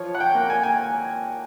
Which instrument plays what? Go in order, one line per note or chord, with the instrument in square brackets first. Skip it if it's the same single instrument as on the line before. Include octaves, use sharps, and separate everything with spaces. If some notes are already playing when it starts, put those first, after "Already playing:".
Already playing: [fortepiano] F3 C#5
F#5
G5
A#3
G#5
G#5